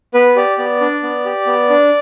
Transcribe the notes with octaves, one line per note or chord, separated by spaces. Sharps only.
B3 B4
G4 D5
B3 D5
D4
B3
G4
B3
D4